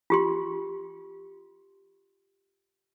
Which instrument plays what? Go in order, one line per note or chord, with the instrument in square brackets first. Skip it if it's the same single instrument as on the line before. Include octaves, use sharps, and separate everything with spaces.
[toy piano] F4 G4 C6